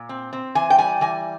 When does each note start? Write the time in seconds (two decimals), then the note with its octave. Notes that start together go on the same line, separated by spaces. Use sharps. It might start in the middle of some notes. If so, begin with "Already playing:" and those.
Already playing: A#2
0.09 C4
0.33 C4
0.55 E3 G#5
0.70 G5
0.78 G3 G#5
1.01 E3 G#5